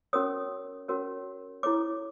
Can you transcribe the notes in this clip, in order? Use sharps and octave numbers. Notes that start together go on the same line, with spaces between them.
C#4 F#4 A#4 C#5 D#6
C#4 F#4 A#4 C#5
E4 A4 C#5 D6